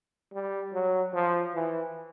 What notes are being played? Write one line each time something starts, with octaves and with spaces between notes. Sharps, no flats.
G3
F#3
F3
E3